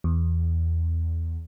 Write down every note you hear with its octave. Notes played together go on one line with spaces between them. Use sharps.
E2